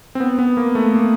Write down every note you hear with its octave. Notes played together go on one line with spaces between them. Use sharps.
C4
B3
B3
A#3
A3
A#3